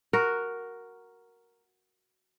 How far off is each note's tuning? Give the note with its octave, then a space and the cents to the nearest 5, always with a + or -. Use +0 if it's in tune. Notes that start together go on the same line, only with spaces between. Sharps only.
F#4 +0 A#4 +0